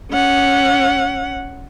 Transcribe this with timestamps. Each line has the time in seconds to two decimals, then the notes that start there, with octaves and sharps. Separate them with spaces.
0.11 C#4 F#5